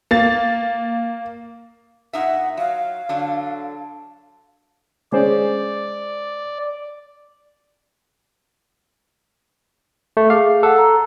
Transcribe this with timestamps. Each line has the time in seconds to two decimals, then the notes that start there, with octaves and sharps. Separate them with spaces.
0.11 A#3 A6
2.13 A#2 D#4 E5 F#5
2.57 F#3 F5
3.09 D3 F#3 D4
5.12 G#3 C#4 C5 D5
10.17 A3
10.30 G#4 F5 D6
10.63 A4 F#5 F#6
10.78 A#5